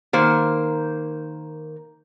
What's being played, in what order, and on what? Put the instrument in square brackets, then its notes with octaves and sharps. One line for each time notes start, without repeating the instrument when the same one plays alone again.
[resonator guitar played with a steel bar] D#3 A#3 C5